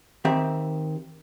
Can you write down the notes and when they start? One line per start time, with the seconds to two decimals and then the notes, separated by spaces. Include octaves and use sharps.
0.25 D#3 C4 G4 E5